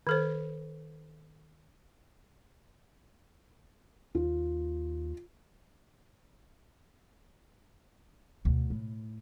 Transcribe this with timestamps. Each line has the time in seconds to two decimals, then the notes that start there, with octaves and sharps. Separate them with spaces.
0.07 D#3 A4 C5
4.15 D#2 F4
8.45 D2 B2
8.70 A2